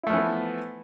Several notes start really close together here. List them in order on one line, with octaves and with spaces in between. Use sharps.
E4 A3 F3 E3 B3